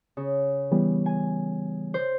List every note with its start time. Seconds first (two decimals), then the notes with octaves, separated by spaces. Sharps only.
0.17 C#3
0.72 E3 G3 B3
1.06 G#5
1.94 C5